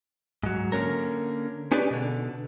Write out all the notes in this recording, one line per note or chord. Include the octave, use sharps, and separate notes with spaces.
G#2 F#3
D3 A#3 C#4 A#4
C#4 D#4 G4 G#4 B4 D5
B2 D3